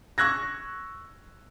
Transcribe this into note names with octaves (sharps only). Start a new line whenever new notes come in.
C#6 E6 F#6 G#6 A#6